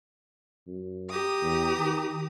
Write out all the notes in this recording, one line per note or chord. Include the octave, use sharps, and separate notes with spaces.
F#2
G4 A#5 D#6
E2
D#3